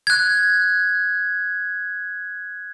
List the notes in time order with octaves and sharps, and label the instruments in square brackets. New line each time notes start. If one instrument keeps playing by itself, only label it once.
[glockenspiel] F#6 G#6